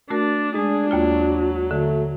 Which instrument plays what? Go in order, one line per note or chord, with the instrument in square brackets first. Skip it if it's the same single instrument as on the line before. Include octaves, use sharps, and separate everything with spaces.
[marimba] A3 F#4 A#4 [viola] D4
[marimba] G#3 [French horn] D4 [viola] G#4
[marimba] D#2 A#3 F4 [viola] F#3
[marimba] D3 [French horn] A3